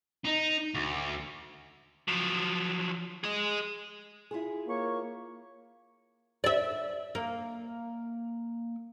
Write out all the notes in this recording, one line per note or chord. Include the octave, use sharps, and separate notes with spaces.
D#4
D2
F3 F#3
G#4 D#5
E4 F4 G#4
A#3 C#5 C#6
D5 E5
A#3